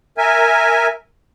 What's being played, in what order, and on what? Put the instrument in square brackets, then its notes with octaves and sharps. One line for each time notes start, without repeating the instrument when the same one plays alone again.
[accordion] A#4 E5 G#5